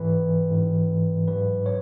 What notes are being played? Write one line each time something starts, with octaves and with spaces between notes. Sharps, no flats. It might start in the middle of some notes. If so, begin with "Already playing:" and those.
Already playing: G#2 E3 B4
G#2 E3
G#2 F#3 B4
C#5